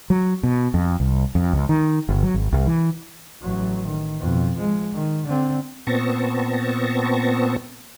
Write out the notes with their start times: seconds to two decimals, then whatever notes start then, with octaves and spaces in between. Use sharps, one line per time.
0.10 F#3
0.43 B2
0.74 F2
1.00 C2
1.35 F2
1.53 C#2
1.69 D#3
2.09 G1
2.23 F#3
2.34 G#1
2.52 C2
2.67 E3
3.42 A1 F#3
3.86 D#3
4.20 F2 B2
4.55 F3 G#3
4.93 D#3
5.26 D3 C4
5.87 A#2 B3 C4 A5 C#6 A#6